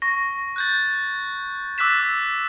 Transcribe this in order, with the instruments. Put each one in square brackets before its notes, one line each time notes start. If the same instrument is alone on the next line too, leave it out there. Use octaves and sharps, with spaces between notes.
[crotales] C#6 A#6
F#6 G6 A6
D6 E6 F#6 A6 B6 E7